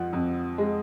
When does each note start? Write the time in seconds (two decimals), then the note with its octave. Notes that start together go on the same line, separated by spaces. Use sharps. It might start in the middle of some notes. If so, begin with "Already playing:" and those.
Already playing: F2 F3 F#5
0.13 F2
0.58 G#3